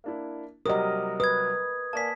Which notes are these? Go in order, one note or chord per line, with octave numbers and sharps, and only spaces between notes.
A#3 D4 E4
C3 F#3 G3 A#4 D#5 D#6
B4 D#6 G#6
A#3 D5 G#5 A5 B6